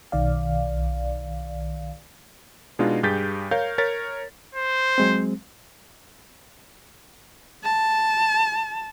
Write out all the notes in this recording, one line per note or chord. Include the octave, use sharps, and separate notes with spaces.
B1 D#3 D5 F5
B2 G#3 D4 D#4 F4
G2 G4 G#4 G6 A6 B6
A#4 C#5 F5 G6
A#4 C#5 A6 B6
C5
F#3 G#3 C4
A5